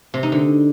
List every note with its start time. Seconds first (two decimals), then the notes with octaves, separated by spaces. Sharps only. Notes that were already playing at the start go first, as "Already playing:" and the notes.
0.14 C3
0.23 D#4
0.32 D3